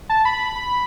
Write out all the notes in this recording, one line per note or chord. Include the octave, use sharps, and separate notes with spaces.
A5
B5